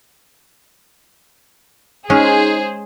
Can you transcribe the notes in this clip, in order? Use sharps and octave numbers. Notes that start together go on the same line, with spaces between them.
G#3 C#4 D#4 G#4 C5